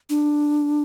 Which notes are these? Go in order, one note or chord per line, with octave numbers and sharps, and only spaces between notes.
D4